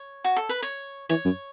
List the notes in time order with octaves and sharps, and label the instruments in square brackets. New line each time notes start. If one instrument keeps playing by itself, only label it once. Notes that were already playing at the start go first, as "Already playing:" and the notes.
Already playing: [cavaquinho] C#5
F#4
A4
B4
C#5
[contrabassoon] E3 [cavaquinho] C#5
[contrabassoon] F#2